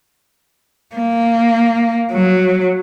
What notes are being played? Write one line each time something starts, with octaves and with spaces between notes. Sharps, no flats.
A#3
F#3